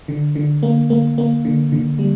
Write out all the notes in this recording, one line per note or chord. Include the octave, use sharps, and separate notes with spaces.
D3
D3
A#3
A#3
A#3
D3
D3
G3